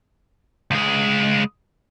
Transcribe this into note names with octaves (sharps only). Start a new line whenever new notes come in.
C#2 G#3